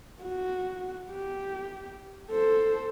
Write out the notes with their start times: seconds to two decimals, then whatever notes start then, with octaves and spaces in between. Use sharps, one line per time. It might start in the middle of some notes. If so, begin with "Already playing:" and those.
0.23 F#4
1.12 G4
2.31 A4 C5